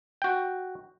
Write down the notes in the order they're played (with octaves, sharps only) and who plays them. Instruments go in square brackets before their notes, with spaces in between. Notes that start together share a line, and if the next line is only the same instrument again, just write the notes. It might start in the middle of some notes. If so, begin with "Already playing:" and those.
[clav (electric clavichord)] F#4 G5